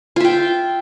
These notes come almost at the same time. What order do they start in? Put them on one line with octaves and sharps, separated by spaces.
F4 E5 G5